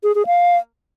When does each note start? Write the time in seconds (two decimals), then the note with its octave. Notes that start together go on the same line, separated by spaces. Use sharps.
0.04 G#4
0.15 G#4
0.27 F5